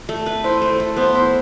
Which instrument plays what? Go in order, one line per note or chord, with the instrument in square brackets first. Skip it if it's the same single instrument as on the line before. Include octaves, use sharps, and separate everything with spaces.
[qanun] A3
B4
[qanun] E4 [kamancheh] C5
[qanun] A3
A3
[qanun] B3 [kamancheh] C5
[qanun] E4